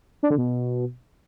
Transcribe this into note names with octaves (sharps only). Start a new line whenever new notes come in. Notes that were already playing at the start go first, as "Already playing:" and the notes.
D4
D3
B2